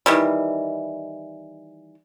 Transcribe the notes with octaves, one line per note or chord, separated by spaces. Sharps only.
D#3 E3 G3